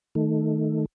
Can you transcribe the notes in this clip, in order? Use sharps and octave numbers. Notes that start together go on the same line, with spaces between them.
D#3 A3